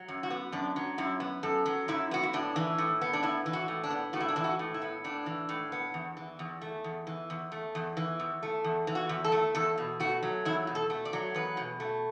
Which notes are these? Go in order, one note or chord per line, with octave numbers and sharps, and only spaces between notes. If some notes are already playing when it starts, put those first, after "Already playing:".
Already playing: F#3
F#2
F#4
B3
F#2 D4
F#3
F#2 E4
B3
F#2 A4
F#3
F#2 E4
B3 F#4
E4
A2 D4
E3
A2
B3
D4
A2 E4
E3
F#4
A2
D4
B3
A2 F#4
E4
D4
E3 E4
F#4
A2
E4
B3
A2 D4
E3
A2
B3
E2
E3
E2
A3
E2
E3
E2
A3
E2
E3
E2
A3
E2
E3
F#4
E2
A4
A3
E2 A4
B2
A3 F#4
F#3
E2 E4
B2
A4
A3
D5
F#3
E2 B4
B2
A3